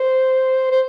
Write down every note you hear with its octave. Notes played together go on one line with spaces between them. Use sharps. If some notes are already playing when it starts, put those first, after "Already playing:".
Already playing: C5
C5